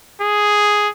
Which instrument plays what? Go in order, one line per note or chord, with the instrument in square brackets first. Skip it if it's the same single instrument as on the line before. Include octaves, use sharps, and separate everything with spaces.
[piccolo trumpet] G#4